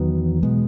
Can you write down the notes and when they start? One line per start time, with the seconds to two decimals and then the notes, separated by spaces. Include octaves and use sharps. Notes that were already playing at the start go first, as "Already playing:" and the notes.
Already playing: E2 D#3 F#3 B3
0.43 B2 G#3 B3